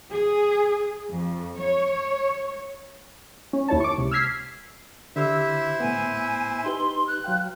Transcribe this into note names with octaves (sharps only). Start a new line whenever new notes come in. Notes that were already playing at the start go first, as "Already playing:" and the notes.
G#4
F2
C#5
C#4
D#2 E4 C#5 A5
C#6 D6
C#2 C3
E6 F6 G#6 B6 C7
D3 E4 G4 C5 E5 E6
A2 B3 G#5
D#4 G4 B4 C6
F#6
F#3 F5 G5